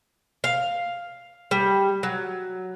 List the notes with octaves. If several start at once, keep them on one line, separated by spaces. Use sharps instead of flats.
F5
G3
F#3